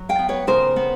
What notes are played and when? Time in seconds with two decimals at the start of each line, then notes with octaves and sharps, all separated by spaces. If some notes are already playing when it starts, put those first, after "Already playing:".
Already playing: F#3
0.09 F5 G5
0.19 B3
0.29 B4 C#5
0.47 C#3 A#4 C5
0.76 B3